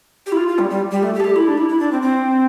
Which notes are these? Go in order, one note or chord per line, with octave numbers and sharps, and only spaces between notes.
G4
E4
F4
F4
G3
G3
G3
A3
G4
A4
G4
E4
D4
E4
E4
D4
C4
C4